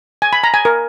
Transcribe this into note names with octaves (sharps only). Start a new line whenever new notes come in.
G#5
B5
A#5
G#5
A#4